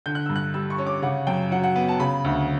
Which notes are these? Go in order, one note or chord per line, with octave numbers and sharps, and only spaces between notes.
D3 G6
F#6
G2 E6
F#6
G3 E6
C#6
C#4
D6
C#3 F#5
F#2 G5
F#3 F#5
F#5
B3
A5
C#3 B5
D2